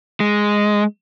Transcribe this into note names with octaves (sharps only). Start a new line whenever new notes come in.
G#3